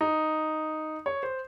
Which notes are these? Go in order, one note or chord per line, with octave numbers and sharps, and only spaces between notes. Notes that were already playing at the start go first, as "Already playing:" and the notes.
D#4
C#5
C5